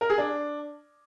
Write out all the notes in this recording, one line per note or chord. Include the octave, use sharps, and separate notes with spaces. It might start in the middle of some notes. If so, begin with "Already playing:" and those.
A#4
G#4
D4